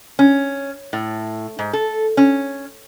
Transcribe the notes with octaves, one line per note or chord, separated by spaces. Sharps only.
C#4
A2
G#2
A4
C#4